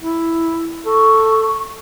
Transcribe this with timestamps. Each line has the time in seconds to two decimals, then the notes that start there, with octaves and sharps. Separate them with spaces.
0.01 E4
0.86 A4 C#6